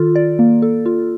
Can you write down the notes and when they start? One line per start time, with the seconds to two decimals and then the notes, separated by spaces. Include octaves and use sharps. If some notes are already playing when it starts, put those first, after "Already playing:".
Already playing: D#3 F4 A4
0.16 D5
0.39 A#3
0.62 A4
0.86 F4